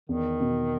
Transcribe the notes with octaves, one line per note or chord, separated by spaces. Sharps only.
E2 D#3
B2